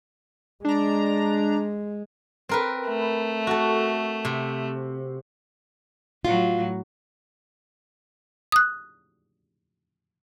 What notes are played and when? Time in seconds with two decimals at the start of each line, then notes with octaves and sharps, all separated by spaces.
0.65 G#3 D4 A#5
2.49 C4 A#4 B4
2.88 A3
3.47 F#4 A4
4.25 C3
6.25 A2 F#3 F4
8.52 D#6 F#6